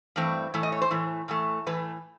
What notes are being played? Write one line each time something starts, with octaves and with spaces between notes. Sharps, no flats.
G2 E3 A3 C4
A2 E3 A3
D#5
C#5
C5
A2 E3 A3
A2 E3 A3
A2 E3 A3 B4